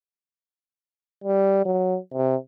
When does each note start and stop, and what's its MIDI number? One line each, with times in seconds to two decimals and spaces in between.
1.24 1.64 55
1.65 1.98 54
2.14 2.36 48